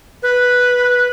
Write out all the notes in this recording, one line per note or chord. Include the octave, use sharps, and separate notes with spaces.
B4